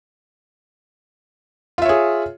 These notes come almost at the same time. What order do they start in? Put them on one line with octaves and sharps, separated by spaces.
F4 E5 C#5 G#4